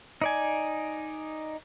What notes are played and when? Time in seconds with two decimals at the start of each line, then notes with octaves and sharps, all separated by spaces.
0.22 D#4 D5 G#5